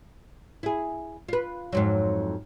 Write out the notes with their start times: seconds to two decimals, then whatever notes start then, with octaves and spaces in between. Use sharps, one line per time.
0.63 E4 G#4
1.29 F4 B4
1.73 F2 G#2 F#3